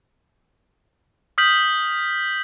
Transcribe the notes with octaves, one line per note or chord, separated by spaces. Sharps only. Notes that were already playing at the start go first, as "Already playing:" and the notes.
D#6 F6 G6 B6 F#7